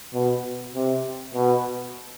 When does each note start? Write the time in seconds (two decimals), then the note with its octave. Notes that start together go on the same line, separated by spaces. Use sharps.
0.14 B2
0.74 C3
1.34 B2